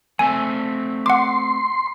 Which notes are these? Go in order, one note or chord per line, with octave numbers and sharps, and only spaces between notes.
A3 C4 E5 G#5
F#5 C6 D6